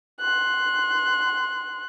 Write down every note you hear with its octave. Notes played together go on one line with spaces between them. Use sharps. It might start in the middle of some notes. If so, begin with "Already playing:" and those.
C6 F#6